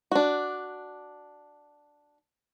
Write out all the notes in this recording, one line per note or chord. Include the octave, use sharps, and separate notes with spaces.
D4 F#4